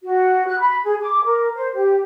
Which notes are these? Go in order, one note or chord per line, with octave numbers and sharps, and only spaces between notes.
F#4
F#6
B5
G#4
D6
A#4
C5
G4